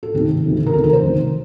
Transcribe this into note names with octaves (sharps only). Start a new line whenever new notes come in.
A4
D2 C3 D#3 G4
D2 C3 D#3
A#4
D2 C3 D#3 A4
A#4
C5
D2 C3 D#3